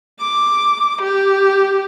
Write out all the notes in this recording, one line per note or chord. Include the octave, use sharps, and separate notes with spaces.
D6
G4